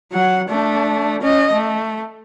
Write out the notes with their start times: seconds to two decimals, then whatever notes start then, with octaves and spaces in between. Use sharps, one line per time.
0.12 F#3 F#5
0.49 A3 D4
1.22 C#4 D#5
1.52 A3